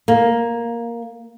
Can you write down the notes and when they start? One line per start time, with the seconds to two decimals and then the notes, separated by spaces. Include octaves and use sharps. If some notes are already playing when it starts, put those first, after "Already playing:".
0.08 A#3